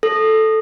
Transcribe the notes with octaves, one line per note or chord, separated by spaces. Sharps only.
A4